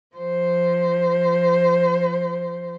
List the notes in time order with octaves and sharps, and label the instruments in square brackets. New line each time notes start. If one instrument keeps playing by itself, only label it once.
[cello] F3 C5